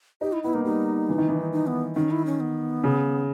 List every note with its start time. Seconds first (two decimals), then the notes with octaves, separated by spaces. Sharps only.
0.21 D#4 G4
0.33 E4
0.43 B3 E4
0.53 A#3 D#4
0.65 G3 D#4
1.09 E3
1.18 D#3
1.28 E3
1.52 D#4
1.67 B3
1.95 D#3 C#4
2.11 E4
2.26 C#4
2.40 B3
2.84 C#3